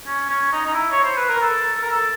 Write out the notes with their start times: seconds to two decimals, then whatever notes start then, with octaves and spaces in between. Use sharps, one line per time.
0.07 C#4
0.30 C#4
0.52 D#4
0.66 D#4
0.74 E4
0.92 C#5
1.04 C5
1.17 B4
1.29 A#4
1.42 A4
1.75 A4
1.82 A#4
1.91 A4